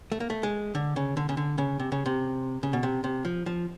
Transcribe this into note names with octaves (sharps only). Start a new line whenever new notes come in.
A3
A#3
A3
G#3
D3
C#3
D3
C#3
D3
C#3
C3
C#3
C3
C#3
B2
C3
C3
F3
F3